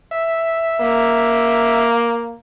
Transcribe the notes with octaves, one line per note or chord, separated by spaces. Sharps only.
E5
A#3